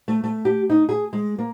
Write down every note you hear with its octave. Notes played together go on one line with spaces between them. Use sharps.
A3
A3
G4
D#4
G#4
G#3
A#3